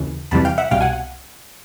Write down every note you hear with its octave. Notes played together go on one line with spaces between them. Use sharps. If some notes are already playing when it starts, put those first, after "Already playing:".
Already playing: D#2 C#3 E3
E2 C3 E3 G3 A5 B5
F5 G5
E5 F#5
C2 B2 G3 F5 G5
F#5 G#5